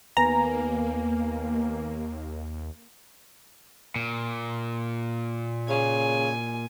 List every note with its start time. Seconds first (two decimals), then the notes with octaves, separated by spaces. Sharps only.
0.17 D#2 A#3 B3 B4 G#5 A#5
3.96 A#2
5.69 C#3 G#5